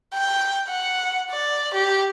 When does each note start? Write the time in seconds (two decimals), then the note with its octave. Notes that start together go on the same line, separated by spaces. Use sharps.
0.14 G5
0.68 F#5
1.31 D5
1.74 G4